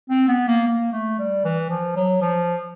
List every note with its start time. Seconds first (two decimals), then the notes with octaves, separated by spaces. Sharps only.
0.10 C4
0.28 B3
0.48 A#3
0.67 A#3
0.93 A3
1.18 G3
1.45 E3
1.70 F3
1.96 F#3
2.21 F3